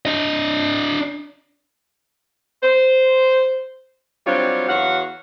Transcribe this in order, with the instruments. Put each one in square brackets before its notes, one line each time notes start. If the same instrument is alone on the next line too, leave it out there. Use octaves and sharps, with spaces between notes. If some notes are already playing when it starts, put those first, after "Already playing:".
[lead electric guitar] D4 D#5
[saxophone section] C5
F#3 G3 C4 D4 F4 C#5
E2 F#3 F#4 F5 F#5